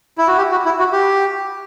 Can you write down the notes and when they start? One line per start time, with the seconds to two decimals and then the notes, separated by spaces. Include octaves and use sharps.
0.18 E4
0.28 F#4
0.37 G4
0.51 F#4
0.65 E4
0.79 F#4
0.92 G4